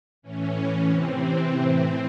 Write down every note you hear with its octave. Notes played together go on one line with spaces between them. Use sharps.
A2 E3 C#4
C3 E3 C4
A2 E3 C4